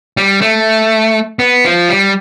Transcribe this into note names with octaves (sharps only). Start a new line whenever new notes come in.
G3
A3
B3
F3
G3